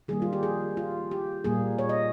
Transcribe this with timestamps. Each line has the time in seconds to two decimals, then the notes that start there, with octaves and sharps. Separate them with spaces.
0.08 D#3 G3 A#3 G#4
0.22 F4
0.33 G4
0.43 G#4
0.77 F4
1.11 G4
1.44 A#2 G3 A#3 G#4
1.79 C#5
1.89 D#5